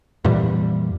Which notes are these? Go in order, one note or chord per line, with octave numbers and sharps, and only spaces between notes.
F2 A#2 E3 G3